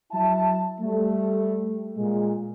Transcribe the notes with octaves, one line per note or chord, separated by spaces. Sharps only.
F#3 E4 E5 A5
G3 A3
A#2 G#3